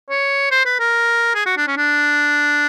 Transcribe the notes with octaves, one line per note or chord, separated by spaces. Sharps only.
C#5
C5
B4
A#4
G#4
F#4
D4
C#4
D4